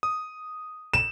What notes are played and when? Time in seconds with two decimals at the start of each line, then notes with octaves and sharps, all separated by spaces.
0.03 D#6
0.93 E7